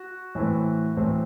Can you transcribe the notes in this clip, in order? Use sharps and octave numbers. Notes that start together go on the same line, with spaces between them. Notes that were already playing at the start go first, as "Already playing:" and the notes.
Already playing: F#4
A2 E3 A3 C4 E4
A2 E3 A3 C4 E4